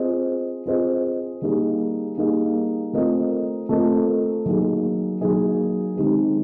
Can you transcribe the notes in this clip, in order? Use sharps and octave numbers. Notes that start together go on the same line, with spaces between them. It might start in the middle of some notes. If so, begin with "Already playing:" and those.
Already playing: C4 F4 G#4 C5 D#5
C4 F4 G#4 C5 D#5
G3 A#3 D#4 G#4
G3 A#3 D#4 G#4
A3 C4 F4 A#4 D#5
A3 C4 F4 A#4 D#5
F#3 A#3 D#4 G#4
F#3 A#3 D#4 G#4
D#3 G#3 C4 D#4 G4